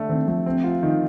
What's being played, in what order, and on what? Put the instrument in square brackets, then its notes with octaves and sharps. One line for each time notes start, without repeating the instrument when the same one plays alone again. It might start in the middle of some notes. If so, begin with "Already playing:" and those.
Already playing: [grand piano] D3 A3 D4
[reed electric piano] D#3 [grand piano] C4
[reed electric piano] F3 [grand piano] A3
[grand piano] C4
F4
D#3